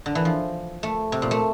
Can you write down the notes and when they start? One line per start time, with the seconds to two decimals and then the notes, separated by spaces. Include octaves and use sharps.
0.06 D3
0.15 E3
0.25 F3
0.83 A3
1.12 C3
1.22 A#2
1.31 A3